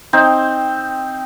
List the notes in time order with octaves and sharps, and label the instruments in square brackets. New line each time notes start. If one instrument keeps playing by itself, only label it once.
[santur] C4 D#4 C5